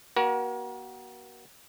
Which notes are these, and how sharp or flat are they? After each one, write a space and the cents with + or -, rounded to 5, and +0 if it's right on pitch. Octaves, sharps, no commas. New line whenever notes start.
A#3 +40 F#4 +30 A#4 +35